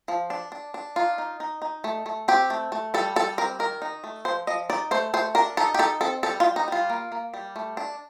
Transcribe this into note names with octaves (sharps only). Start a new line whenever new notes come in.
F3
D4
D4
D4
D#4 F4
D#4
D#4
D#4
A3
A3
C4 G4
A3
A3
G3 A4
G3 A4
C4 A#4
D#3 A#4
D#4
A3
F3 C5
F3 D#5
D#4 D5
A3 C5
A3 C5
D4 A#4
D#4 A4
G4
D#4 A4
C4 A4
G3 A4
F4
G3
D#4
G3 F4
A#3
A#3
G3
A3
D4